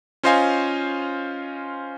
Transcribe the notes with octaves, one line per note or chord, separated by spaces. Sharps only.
C#4 F4 C5 D#5 F5 G#5